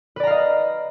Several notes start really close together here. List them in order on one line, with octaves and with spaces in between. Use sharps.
B4 D5 A#5 F5 D#5